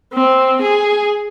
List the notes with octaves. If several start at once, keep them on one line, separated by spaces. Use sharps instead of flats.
C4
G#4